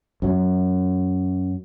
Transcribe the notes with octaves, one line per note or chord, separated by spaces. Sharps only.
F#2 F#3